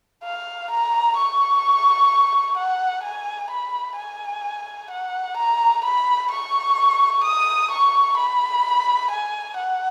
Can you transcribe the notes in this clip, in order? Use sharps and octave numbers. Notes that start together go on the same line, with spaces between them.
F5
A#5
C#6
F#5
G#5
B5
G#5
F#5
A#5
B5
C#6
D#6
C#6
B5
G#5
F#5